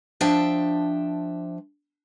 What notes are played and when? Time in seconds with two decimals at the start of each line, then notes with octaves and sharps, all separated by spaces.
0.21 F3 D4 E5 G5 A5